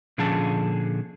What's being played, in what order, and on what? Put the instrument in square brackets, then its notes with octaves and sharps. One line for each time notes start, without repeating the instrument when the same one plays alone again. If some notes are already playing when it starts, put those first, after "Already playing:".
[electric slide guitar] A#2 D3 F3 C#4 G#4 A5